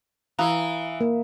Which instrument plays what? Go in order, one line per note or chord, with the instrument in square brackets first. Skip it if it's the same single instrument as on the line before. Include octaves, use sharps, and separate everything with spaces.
[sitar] E3 [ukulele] E4 B4 A#5 [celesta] F5 D#6
[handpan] A#3